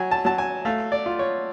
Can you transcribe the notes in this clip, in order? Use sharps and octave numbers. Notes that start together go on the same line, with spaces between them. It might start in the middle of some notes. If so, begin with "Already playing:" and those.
Already playing: F#3 G#5
A5
F#3 A5
G#5
A3 F5
D5
F4
C#5